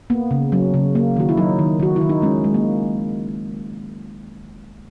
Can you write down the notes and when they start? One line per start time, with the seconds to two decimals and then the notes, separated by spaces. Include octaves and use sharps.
0.10 A#3 B3
0.31 C#3
0.52 F#3 C#4
0.74 C#3
0.95 A#3
1.16 D#3 F#4
1.29 E4
1.37 F#3 D#4
1.59 D#3
1.80 D#3 F#4
1.96 E4
2.01 D#3
2.09 D#4
2.22 G#3 C#4
2.44 G#3
2.54 A#3